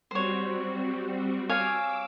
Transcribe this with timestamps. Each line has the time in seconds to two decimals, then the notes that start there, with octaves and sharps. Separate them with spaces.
0.11 G3 C4 F#4 C5 C#5
1.49 C#5 F5 G#5 D6 E6